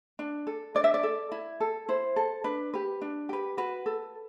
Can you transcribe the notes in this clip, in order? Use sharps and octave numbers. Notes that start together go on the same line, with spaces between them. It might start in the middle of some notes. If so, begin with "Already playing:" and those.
D4
A4
D4 D5
E5
D5
A4
E4
A4
E4 C5
A4
D4 B4
G4 B4
D4
G4 B4
F#4 B4
A4